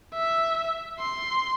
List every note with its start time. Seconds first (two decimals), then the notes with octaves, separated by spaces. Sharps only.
0.14 E5
0.99 C6